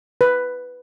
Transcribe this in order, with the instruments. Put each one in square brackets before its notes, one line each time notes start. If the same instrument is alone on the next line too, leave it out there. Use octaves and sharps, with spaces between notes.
[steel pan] B4